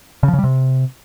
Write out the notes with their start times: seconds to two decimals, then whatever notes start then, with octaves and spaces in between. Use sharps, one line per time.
0.23 C#3
0.28 F3
0.33 C#3
0.39 G3
0.44 C3